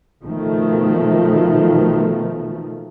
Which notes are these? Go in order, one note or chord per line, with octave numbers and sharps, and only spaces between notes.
B2 D#3 F3 A3